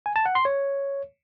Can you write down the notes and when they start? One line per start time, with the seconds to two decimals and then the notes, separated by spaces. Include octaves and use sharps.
0.06 G#5
0.16 A5
0.25 F#5
0.35 C6
0.45 C#5